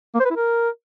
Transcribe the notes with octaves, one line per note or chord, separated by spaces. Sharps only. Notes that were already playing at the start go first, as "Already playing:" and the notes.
A#3
C5
B4
E4
A#4